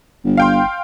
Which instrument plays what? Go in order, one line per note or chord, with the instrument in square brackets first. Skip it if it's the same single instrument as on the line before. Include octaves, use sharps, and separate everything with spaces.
[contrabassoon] G1
[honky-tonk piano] F5 G5 C6